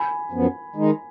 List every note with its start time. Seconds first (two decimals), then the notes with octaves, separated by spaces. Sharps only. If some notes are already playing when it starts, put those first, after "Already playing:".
Already playing: G#5 B5
0.32 F#2 F3 B3
0.76 D#3 G#3 D#4